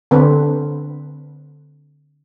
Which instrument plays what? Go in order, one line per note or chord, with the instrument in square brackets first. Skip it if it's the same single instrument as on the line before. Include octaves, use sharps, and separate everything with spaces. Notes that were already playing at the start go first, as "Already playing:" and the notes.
[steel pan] D3 C4 B4